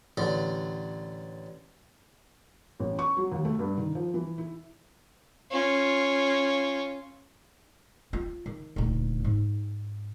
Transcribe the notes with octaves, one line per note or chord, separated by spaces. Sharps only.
A1 D3
A1
C#6
F#3
D#2
A3
G2
D#3
F3
E3
E4
C#4 F4
F4
D#3
D#1 D2
G#2